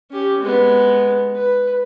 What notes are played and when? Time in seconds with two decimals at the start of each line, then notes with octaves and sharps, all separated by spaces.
0.11 C#4 G4
0.41 G#3 B3
1.36 B4